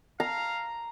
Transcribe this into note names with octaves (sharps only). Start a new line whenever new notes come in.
F5 A#5